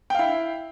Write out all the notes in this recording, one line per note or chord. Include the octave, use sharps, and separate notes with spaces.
E4 F5 G5